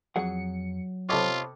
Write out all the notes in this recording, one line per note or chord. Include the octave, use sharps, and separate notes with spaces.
F2 F#3 G#4 F#5 C#7
C3 F4 A4 C#5 D#5 B5 D6